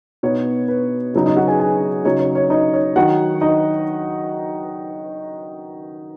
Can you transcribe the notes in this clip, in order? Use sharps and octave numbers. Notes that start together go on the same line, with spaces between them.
B2 B3 D#4 C#5
B4
C#3 F#3 D#4
D#4 D#5
F#4 F#5
G#4 G#5
G#4 G#5
C#3 F#3 D#4 C#5
C#5
C#5
D#4 D#5
C#5
D#3 F#3 D#4 F#4 F#5
D#4 D#5